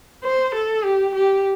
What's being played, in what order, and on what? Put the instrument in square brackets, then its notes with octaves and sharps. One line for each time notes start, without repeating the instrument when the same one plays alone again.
[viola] C5
A4
G4
G4